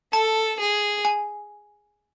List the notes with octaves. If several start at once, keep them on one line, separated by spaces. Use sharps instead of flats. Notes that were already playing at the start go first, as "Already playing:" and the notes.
A4 A5
G#4
G#5